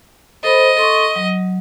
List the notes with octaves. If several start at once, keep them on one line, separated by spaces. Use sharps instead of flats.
A4 C5 D#5 B5
A4 C6 C#6
F#3